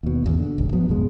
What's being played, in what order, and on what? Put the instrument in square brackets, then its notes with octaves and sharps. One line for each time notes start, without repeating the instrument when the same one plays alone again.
[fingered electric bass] D#2 B2
G#1 E2
D3
D1 G#1 C#2
F3 F#3 B3
A1 F#2 B2 G#3